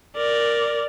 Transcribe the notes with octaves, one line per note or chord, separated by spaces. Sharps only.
A#4 D5